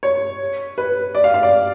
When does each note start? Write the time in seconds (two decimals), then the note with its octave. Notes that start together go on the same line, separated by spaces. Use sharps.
0.03 C#5
0.78 B4
1.15 D5
1.24 F5
1.34 F5
1.43 D5